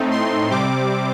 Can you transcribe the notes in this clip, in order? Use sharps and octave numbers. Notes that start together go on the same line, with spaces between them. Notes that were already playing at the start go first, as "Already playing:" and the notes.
Already playing: A2 A3 C4 D#4
C6
C3 G3 C4 D6